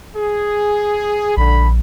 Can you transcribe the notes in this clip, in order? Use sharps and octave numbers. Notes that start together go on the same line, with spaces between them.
G#4
A#1 D3 B5